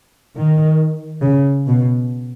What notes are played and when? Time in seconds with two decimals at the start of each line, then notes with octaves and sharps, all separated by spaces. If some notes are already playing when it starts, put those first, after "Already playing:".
0.37 D#3
1.23 C#3
1.67 B2